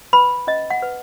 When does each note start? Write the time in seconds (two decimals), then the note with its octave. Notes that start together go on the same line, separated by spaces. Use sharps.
0.13 B4 B5
0.47 C#4 D#5
0.70 F#5
0.82 B4